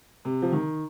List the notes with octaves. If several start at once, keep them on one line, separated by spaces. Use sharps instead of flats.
C3
F3
D#3